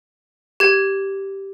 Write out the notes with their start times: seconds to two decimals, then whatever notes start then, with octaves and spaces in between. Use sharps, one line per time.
0.60 G4 G#6